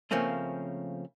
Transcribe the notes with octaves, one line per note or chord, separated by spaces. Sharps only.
C#3 F3 A3 A#3 C4 C#4